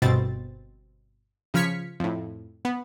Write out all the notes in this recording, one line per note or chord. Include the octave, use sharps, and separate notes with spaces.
G1 B2 C4 A6
C#3 F3 F6 G#6 B6 C#7
F2 A2
B3